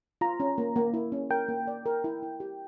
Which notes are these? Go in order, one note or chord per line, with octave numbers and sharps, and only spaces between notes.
F4 A#5
C#4
A#3
A#3
E4
C#4
A#4 G5
A#3
D5
A#4
E4
E4
G4